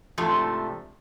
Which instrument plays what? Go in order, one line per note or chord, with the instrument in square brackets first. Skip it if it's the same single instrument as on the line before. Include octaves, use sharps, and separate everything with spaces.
[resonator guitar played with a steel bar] G#2 C3 F3 A3 D4